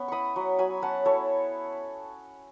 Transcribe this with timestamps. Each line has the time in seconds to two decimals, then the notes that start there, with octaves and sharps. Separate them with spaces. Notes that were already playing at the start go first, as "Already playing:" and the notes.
Already playing: B3 C#4 G#5
0.08 E4 B5 C#6 D#6
0.36 F#3
0.58 F#3 G#5 B5
0.82 C#4 F#5 A5
1.05 E4 A4 C#5